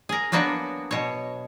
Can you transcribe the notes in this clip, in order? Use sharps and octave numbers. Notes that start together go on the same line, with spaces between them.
G#4 A#4
F#3 A#3 B3 D4 F#4
B2 C#5